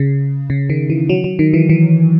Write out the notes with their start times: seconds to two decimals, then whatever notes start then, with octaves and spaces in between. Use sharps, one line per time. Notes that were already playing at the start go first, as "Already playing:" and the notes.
Already playing: C#3
0.50 C#3
0.70 D#3
0.90 E3
1.09 F#3
1.24 F#3
1.39 D#3
1.54 E3
1.69 E3